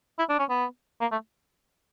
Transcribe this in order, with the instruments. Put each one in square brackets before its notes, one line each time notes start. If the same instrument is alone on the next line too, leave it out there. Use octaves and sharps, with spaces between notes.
[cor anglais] E4
D4
C#4
B3
A#3
A3